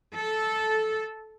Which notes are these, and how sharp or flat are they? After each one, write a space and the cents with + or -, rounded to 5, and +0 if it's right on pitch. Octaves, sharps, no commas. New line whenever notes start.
A4 -10